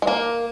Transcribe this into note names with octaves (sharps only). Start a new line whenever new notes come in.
G#3
A#3